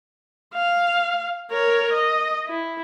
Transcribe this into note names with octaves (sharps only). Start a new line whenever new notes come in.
F5
A#4 C#5
D#5
E4